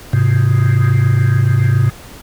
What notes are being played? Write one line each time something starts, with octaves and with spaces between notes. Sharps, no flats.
G#2 C3